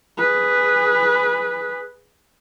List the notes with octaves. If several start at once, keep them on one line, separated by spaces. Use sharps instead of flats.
G#4 B4